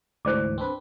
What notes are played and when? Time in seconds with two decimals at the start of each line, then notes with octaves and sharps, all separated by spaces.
0.25 D2 G#2 E3 C5 D5 D6
0.58 C4 D4 B4